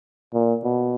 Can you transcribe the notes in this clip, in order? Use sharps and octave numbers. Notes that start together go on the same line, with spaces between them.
A#2
B2